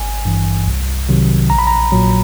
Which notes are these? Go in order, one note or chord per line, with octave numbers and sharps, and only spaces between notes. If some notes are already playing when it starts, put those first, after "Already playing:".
Already playing: G#1 G#5
G2 E3
C2
C3 D#3 F#3
A#1 A#5
B5
A#5
A#2 F#3